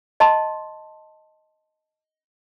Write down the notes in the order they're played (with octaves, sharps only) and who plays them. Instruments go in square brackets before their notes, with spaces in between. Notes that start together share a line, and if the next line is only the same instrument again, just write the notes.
[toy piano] D#5 A5 C6